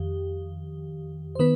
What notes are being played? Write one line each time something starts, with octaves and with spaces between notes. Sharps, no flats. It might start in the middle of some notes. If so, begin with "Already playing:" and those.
Already playing: F2 D#3 G4
C5
D#3 B3 B4